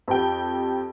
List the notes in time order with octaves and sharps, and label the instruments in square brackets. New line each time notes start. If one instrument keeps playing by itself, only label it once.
[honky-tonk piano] F2 G4 G5